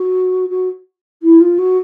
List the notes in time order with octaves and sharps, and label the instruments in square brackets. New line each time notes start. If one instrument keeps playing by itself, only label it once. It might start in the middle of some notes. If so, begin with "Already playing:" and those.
Already playing: [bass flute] F#4
F#4
E4
F4
F#4